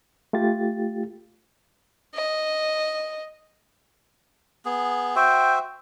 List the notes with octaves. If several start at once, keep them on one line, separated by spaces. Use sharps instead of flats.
A3 F4 G4 A6
D#5
B3 G#4
F#4 C5 E5 G5